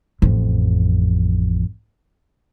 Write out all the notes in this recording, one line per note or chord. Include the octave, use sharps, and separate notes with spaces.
A1 F2